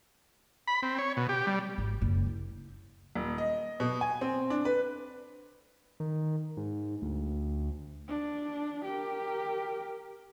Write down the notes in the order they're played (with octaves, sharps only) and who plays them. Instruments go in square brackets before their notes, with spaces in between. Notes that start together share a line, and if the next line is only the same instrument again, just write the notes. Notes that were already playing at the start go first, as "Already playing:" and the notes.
[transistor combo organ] B5
C4
C#5
B2
G4
G3
[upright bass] G#1
F#1
E4
[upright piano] D#1
D#5
B2
G#5
C4
D4
B4
[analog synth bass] D#3
G#2
D2
[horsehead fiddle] D4
G4 A#4